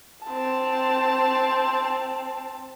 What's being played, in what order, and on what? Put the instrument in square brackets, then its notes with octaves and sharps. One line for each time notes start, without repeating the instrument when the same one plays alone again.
[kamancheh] C4 A5